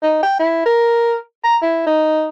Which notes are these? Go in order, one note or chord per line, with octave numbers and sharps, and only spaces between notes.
D#4
G5
E4
A#4
A#5
E4
D#4